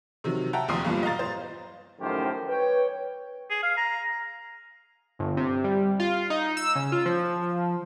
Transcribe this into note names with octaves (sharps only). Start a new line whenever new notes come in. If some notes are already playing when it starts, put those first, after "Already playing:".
C3 D#3 F#3
E5 F#5 G5 A5 A#5
F1 A#1 D#2 C6 D#6 C7
B1 G2 A#2 F3
D#5 F5 A#5 A6
C5
F#2 A2 D#3 F3 G4 C5
B4 C#5 G5
G#4
F5
A#5
G1
C3
G3
F4
D#4
E6
C#3
F4
F3